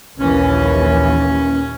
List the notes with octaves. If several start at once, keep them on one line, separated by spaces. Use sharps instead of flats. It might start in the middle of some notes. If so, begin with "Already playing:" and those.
A#1 D#2 E3 C#4